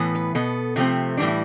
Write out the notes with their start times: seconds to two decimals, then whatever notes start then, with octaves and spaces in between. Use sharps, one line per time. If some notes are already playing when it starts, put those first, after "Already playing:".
Already playing: A2 E3 B3
0.15 B4
0.35 B2 B3 A4
0.76 C3 F3 A3 C4
1.17 A2 E3 G3 D4
1.28 E4